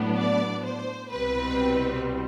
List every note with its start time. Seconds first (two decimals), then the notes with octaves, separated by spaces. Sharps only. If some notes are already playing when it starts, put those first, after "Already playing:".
Already playing: A2 F#3 B3 D4
0.16 D5
0.63 C5
1.11 C2 B2 G3 C4 B4